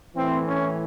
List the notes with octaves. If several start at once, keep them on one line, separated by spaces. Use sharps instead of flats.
A2 E3 C4
C#4